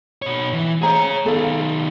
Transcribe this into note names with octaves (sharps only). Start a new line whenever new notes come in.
B2 C#5
E3
G#4 C5 C#5 A#5
D#3 B3 A4 F5